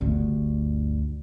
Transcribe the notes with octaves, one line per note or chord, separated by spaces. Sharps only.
G1 D2